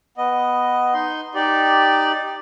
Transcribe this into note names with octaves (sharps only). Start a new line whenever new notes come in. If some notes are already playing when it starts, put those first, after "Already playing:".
B3 D#5
D#4 C6
D#4 G4 D5